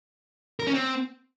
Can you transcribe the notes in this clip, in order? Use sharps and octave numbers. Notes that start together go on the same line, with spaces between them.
A#4
C#4
C4